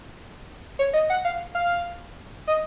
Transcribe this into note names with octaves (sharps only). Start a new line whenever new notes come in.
C#5
D#5
F#5
F5
F5
D#5